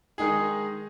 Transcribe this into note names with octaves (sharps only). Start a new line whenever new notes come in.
D#3 G#3 D#4 G#4